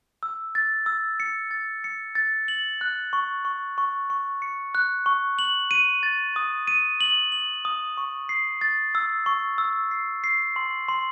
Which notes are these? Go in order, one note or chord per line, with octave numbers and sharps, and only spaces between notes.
E6
A6
E6
C#7
A6
C#7
A6
F#7
F#6
C#6
C#6
C#6
C#6
C#7
F#6
C#6
F#7
D#7
A6
D#6
D#7
F#7
F#7
D#6
C#6
C7
A6
E6
C#6
E6
C7
C7
C6
C6